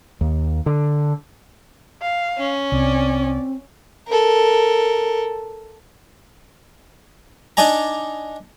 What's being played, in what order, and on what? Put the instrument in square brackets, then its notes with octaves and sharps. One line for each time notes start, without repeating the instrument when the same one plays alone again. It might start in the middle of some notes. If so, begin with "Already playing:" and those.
[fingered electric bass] D#2
D3
[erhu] F5
[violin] C#4
[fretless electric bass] C2 [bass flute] C4 [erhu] D5
[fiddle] A4 A#4
[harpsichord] D4 D#4 D5 G#5 A#5